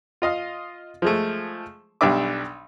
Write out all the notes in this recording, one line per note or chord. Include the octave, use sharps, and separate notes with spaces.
F4 D#5 F5
F3 G#3 A3
B1 G3 D4 E5 D6